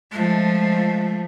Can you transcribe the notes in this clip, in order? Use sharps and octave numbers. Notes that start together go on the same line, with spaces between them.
F3 G#3 A3